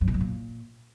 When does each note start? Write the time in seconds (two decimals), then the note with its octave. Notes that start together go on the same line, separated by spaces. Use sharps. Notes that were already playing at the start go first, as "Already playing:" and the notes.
0.01 F#2
0.08 B2
0.14 F#2
0.21 A#2